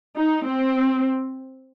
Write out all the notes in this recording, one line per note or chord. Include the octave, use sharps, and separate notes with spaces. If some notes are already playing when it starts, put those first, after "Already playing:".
D#4
C4